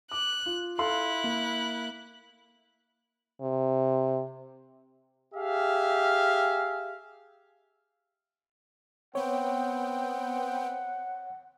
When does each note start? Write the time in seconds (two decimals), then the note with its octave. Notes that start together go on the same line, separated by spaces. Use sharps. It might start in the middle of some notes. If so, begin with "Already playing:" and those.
0.11 D6 F#6
0.46 F4
0.78 E4 A4 F5 C6 F#6
1.24 A#3
3.41 C3
5.34 G4 G#4 E5 F5
9.15 B3 C4 C#5 F#5 G5